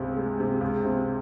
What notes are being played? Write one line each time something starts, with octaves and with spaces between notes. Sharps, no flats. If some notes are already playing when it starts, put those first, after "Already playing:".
Already playing: C#2 C3
G#3
C3
C#2
C3